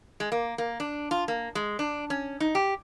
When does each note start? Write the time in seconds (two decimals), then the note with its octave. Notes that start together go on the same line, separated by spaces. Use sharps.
0.20 G#3
0.32 A#3
0.58 A#3
0.80 D4
1.11 F4
1.28 A#3
1.55 G#3
1.79 D4
2.10 C#4
2.40 D#4
2.55 G4